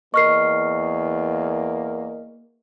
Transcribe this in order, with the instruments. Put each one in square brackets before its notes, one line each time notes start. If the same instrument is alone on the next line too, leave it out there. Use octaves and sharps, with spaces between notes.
[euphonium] E2 [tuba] A#3 [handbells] A#4 D#5 [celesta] C#6 F6 C7